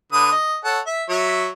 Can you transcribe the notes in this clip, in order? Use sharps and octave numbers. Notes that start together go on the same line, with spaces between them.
D3 B4 D#6
D#5
A4 C#5 F#5
E5
F#3 C#5 E5